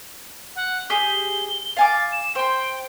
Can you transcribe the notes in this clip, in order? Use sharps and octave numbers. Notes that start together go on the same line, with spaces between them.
F#5
G4 G#4 G7
F5 G#5 D6 A6
E7
C5 G5 C6